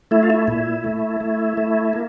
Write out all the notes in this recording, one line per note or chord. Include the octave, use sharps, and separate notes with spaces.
A3 E4
F4
E4
A#2 E4
A3
A3
A3
A#3